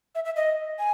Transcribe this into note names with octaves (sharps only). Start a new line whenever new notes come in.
E5
E5
D#5
G#5